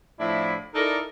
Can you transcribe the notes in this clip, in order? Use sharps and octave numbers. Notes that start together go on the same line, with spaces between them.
A2 F3 D4 E4
D#4 E4 A4 A#4 D5